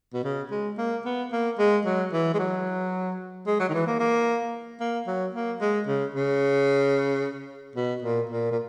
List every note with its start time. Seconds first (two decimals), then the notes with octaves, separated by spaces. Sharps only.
0.14 B2
0.24 C#3
0.51 G#3
0.78 A#3
1.06 B3
1.32 A#3
1.59 G#3
1.85 F#3
2.13 E3
2.34 G#3
2.39 F#3
3.47 G#3
3.60 F#3
3.69 D#3
3.74 E3
3.87 A#3
4.00 A#3
4.80 A#3
5.07 F#3
5.35 A#3
5.61 G#3
5.87 C#3
6.15 C#3
7.76 B2
8.02 A#2
8.30 A#2
8.52 A#2